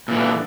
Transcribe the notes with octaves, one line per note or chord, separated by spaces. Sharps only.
A#2 D3 E3